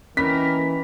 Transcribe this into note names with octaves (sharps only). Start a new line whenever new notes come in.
D#3 E3 A#3 C#4 A#4 B5 B6